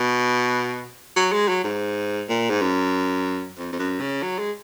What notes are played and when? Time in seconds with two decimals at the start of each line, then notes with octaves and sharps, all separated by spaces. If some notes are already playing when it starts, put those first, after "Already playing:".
Already playing: B2
1.16 F#3
1.33 G#3
1.49 F#3
1.64 G#2
2.29 A#2
2.50 G#2
2.62 F#2
3.58 F2
3.73 F2
3.79 F#2
4.01 C#3
4.23 F#3
4.39 G#3